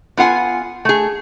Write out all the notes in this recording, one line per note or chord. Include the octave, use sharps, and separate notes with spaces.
B3 F4 F#5 G#5
A3 G#4